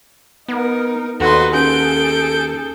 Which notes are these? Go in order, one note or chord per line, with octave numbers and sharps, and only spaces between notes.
B3 D#4 A#4
D#2 D#4 F#4 A4 B4 C6
C#4 G#4 A4 G6 D7